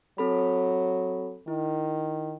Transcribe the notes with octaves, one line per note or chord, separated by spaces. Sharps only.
F#3 C4 A4 B5
D#3 E4